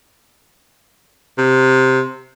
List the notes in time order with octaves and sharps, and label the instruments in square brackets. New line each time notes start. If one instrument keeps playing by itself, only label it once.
[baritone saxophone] C3